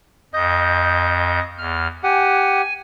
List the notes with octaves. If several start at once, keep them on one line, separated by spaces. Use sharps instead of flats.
F2 D#5 G6
E2 F6
G4 F#5 G#5